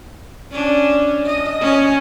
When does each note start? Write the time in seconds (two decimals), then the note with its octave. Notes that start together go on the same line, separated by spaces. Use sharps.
0.52 C#4 D4
1.26 D#5
1.61 C#4